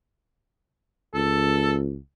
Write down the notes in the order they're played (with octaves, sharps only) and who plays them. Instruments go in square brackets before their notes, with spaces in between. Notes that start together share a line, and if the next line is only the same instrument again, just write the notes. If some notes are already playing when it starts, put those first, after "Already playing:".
[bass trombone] C#2 [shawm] A4